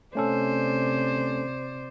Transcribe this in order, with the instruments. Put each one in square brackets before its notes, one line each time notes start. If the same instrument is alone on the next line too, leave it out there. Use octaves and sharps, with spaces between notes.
[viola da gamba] C3 C5 D5 [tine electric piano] A3 C#4 A4